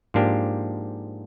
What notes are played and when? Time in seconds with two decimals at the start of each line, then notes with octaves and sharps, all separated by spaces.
0.14 G#2 F3 A#3 D4 G4